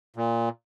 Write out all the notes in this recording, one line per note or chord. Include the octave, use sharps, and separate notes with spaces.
A#2